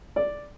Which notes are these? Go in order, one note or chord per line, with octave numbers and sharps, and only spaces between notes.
D5